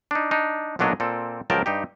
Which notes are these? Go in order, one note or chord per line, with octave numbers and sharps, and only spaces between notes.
D4 D#4
D4 D#4
B1 A#2 F#3 D4 C#5 D#5
A#2 C4 A4
C#2 F3 F#3 A#4 G5 A5
G2 D#4 G4